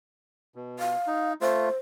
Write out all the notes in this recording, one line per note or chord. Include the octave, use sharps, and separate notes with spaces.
B2
F5
D#4
A3 F4 C5